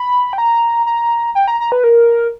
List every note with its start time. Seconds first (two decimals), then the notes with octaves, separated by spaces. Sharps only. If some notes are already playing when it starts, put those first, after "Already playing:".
Already playing: B5
0.33 G5
0.38 A#5
0.86 A#5
1.35 G5
1.48 A#5
1.60 A#5
1.72 B4
1.84 A#4